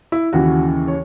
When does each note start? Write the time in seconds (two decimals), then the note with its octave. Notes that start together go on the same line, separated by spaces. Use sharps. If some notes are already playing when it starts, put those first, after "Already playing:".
0.12 E4
0.33 D#2 C#3 E3 F#4
0.88 C#5